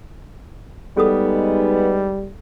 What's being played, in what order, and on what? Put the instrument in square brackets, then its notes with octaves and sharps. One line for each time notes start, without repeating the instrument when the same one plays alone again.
[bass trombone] G3 [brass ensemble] G#3 D#4 [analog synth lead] B3 [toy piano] G#4 A4 D#6